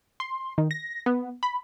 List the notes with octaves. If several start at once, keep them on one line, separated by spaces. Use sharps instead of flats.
C6
D#3
A#6
B3
B5